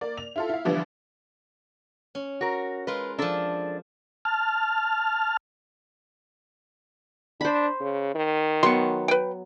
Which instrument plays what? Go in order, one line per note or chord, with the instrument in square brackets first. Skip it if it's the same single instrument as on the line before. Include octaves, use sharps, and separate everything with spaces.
[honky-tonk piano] A#3 D5
F7
E4 F4 A4
E4 F5
D3 E3 F3 G3 B3
[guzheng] C#4
[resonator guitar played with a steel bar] F#4 A#4
[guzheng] G#3 F4 A#4 [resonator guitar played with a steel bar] B4
[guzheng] F3 E5 [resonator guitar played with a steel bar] D4 A4
[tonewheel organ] A5 F6
[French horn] D4 [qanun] C5 B5
[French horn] C#3
D#3
[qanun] F#3 B3 C#6 [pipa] C6
[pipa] B4 G5